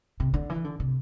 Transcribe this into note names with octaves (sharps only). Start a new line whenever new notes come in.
C3
D3
E3
D3
C3